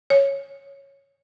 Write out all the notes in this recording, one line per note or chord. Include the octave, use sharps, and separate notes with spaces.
C#5